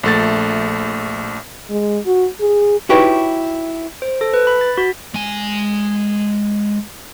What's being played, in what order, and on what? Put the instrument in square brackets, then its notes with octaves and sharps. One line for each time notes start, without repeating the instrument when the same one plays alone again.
[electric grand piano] A#1 A3 A6
[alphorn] G#3
F#4
G#4
[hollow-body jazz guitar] D#4 E4 F#4 G4 B4 C#5
[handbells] C5
A4
B4
B5
A6
F#4
[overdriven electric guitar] G#3 G#5